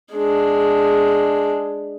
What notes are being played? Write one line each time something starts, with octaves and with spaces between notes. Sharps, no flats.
G#3 D4